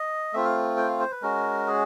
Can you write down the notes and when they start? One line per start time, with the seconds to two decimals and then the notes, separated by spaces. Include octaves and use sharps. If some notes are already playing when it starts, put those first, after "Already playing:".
Already playing: D#5
0.33 A3 C4 F4 E5
0.45 F5
0.77 G5
0.89 F5
1.00 C5
1.12 B4
1.22 G#3 C#4 F#4 A#4
1.67 G#4